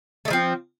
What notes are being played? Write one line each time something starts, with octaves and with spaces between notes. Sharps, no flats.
F3 G#3 A3 C4